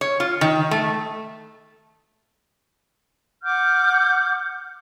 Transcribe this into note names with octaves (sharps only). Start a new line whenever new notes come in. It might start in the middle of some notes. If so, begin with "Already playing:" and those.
C#5
F4
D#3
A3
F#5 D6 F6 G6